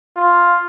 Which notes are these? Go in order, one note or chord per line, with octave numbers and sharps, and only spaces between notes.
F4